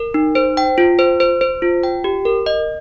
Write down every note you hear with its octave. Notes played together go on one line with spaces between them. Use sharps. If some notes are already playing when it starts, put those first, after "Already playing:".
Already playing: A#4
D#4
C5
G5
F4
C5
C5
C5
F4
G5
G4
A#4
D#5